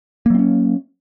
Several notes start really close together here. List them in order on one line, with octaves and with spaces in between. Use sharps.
A#3 F#3 C4 C#4